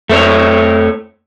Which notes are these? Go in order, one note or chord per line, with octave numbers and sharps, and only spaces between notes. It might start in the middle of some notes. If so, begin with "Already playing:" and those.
F2 A3 C5 C#5